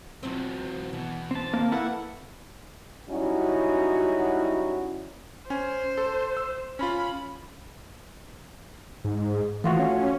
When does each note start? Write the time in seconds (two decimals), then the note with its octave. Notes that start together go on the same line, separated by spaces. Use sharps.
0.23 E2 B2 F#3 C4 F4
0.93 E2 B2 E3
1.31 C4 A5
1.54 A#3
1.72 F3 E4 A4 B4 F#5
3.10 F#3 G3 C#4 D#4 E4 F#4
5.50 C#4 C5 G#5
5.98 A4
6.37 E6
6.79 C#4 F4 B5
9.05 G#2
9.64 E3 A3 F4 F#4
9.79 C#4